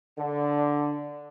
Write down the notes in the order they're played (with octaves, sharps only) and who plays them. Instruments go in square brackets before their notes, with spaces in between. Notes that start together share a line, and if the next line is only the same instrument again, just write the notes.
[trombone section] D3